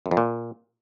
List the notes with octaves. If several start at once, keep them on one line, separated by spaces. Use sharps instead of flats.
F#2
F2
A#2